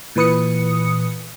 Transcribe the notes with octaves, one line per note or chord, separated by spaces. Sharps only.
A#2 E3 B4 D#6 C#7